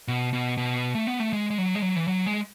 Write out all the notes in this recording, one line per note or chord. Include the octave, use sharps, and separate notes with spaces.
B2
B2
B2
A3
B3
A3
G#3
G#3
F#3
G#3
F#3
E3
F#3
G#3